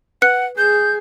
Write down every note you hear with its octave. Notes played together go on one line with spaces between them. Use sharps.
B4 F#5 F#6 C#7
G#4 G6